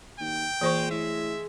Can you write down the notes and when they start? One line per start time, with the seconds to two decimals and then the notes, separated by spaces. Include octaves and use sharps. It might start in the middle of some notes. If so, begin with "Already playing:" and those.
0.20 D#2 G5
0.61 A#2 E3 G#3 C5 C#6
0.91 A2 E5